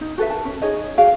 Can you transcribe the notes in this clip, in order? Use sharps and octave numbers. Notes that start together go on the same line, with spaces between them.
D#4
F#4 A4 B4 E5
A#4 A5
C#4
D#4 G#4 C#5 D#5
F#4 G#4 D5 F5